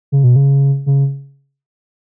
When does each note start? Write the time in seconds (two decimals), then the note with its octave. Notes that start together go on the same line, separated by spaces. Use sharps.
0.12 C#3
0.24 B2
0.36 C#3
0.86 C#3